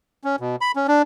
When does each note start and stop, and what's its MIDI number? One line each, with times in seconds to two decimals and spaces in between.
0.24 0.36 61
0.40 0.56 47
0.61 0.72 83
0.76 0.87 61
0.88 1.02 62